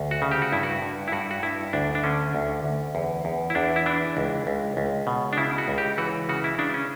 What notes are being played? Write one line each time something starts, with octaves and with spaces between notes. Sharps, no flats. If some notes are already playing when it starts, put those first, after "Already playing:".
Already playing: D2
F#4
C#3
G4
F#4
G2 E4
F#4
G2
E4
G2 F#4
F#4
G2 E4
D2 D4
D4
D3 C#4
D2
D2
E2
E2
E4
E2 D4
E4
E3 D4
C#2
C#2
C#2
B2
D4
C#3 E4
F#4
C#2
G4
E3 F#4
C#3 F#4
E4
C#3 D4
C#4